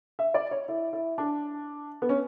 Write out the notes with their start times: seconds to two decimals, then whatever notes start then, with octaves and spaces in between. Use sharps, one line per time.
0.19 E5
0.34 D5
0.51 C#5
0.68 E4
0.93 E4
1.18 D4
2.02 B3
2.09 C#4